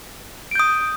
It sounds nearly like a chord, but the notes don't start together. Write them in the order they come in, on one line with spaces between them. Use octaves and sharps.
D7 G6 D#6